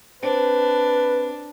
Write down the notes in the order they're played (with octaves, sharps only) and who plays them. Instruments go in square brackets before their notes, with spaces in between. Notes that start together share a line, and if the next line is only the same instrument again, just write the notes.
[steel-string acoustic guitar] C4 [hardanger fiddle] D4 [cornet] B4